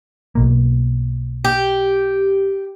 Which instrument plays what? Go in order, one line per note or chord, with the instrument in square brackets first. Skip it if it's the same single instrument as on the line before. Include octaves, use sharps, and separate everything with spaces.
[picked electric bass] B1 B2 A#3
[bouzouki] G4